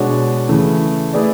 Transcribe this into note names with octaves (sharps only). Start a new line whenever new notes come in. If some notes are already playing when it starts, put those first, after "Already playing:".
Already playing: B2 G#3 D4 F#4 C#5
C#3 E3 A3
A3 E4 G#4 B4 D5